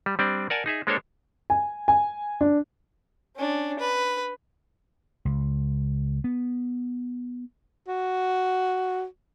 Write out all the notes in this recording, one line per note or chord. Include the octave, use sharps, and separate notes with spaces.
G3
G3 C4 D4 D5
A#4 D5 F#5 G#5 A5
D#4 G#4 E5
G#3 A#3 D4 A4 C5 C#5
G#5
G#5
D4
C#4 D4
B4
C#2
B3
F#4